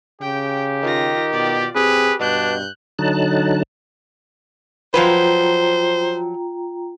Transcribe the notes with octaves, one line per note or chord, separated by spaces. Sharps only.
C#3 G4 G5
D#3 F4 A#6
B2 F4 D5
C4 G4 G#4 B4
G2 B2 D4 F#6 G6
D3 F#3 D#4 A5 F#6
F3 F#3 F4 B4 C5 G5 A#5